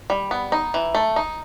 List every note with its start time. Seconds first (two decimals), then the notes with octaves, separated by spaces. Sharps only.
0.10 G3
0.31 B3
0.52 D#4
0.74 E3
0.95 A3
1.16 D#4